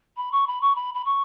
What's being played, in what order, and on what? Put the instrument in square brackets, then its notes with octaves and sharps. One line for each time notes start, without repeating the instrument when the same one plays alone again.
[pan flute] B5
C#6
B5
C#6
B5
B5
C#6